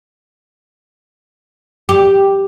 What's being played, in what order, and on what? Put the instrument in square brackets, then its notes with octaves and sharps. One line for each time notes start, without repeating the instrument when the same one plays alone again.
[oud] G4